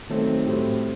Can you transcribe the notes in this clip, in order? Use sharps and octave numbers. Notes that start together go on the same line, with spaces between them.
D#3 F#3 A3 C4
A2 G3 C4